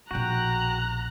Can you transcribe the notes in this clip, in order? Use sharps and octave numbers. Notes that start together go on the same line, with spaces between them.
A#1 B2 F#4 G5 A#5 F#6